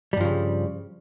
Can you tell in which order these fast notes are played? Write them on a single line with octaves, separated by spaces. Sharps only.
G3 G2 F3 C#3